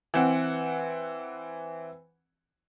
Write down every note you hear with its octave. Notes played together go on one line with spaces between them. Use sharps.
E3 C4 F#5